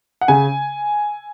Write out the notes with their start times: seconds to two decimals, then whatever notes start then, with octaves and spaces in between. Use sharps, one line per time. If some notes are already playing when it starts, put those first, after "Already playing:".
0.21 F#5
0.28 C#3 G#5